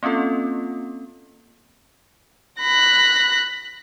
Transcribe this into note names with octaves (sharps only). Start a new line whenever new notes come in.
A#3 C4 C#4 F4 A4
B5 F#6 A#6